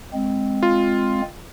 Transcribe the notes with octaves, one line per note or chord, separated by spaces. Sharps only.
G#3 C4
F4